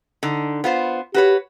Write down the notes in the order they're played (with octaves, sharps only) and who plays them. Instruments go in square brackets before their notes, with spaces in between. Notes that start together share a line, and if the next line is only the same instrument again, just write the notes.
[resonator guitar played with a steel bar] D3 D#4
B3 F4 C5
[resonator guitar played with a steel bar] F#4 B4 C#5 [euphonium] G4